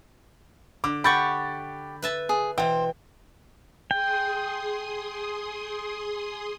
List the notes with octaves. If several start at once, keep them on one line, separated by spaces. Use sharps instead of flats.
D3 D6
G4 F#5 B5 C#6 G6 A6
B4 E5 A5
G#4
B2 E3 C5 G5
G#4 G5 C6 D#6